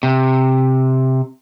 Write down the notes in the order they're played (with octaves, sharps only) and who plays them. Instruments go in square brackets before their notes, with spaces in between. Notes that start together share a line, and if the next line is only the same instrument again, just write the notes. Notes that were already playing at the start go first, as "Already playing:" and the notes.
[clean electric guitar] C3